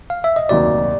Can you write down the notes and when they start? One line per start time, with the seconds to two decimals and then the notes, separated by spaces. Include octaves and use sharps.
0.10 F5
0.24 E5
0.36 D#5
0.49 D2 C3 D#3 F#3 A#3 D5